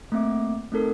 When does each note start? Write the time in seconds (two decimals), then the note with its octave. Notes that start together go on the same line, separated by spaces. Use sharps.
0.12 A3 A#3 C4 E5 D6
0.72 A3 C4 D#4 A4 A#4